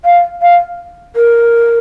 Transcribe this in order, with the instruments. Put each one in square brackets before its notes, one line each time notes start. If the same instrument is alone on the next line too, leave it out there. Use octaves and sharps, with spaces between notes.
[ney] F5
F5
A#4